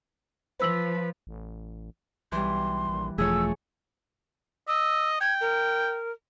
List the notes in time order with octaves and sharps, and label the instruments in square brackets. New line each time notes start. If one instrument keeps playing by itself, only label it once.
[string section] F3 [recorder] B4 [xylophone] C5 E6 F#7
[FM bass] A1
[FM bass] B1 [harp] E3 G3 [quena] C6
[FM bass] A#1
[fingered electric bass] E1 F3 [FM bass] A3 [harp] G#4 C#5 [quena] E6
[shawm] D#5 [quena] E6
[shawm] G5 [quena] G#6
[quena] A#4